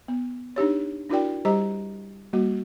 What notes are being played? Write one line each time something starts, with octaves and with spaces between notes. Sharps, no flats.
B3
D4 D#4 G4 C#5
D4 E4 F#4 A#4 D5 G5
G3 G4 C5 D#5 A#5
G3 A#3 F#4